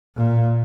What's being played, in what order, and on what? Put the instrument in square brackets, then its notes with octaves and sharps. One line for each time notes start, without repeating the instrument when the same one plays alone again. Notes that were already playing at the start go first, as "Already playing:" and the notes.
[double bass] A#2